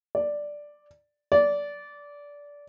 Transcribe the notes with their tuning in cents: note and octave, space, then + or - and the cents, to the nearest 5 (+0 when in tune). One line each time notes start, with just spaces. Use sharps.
D5 +0
D5 -20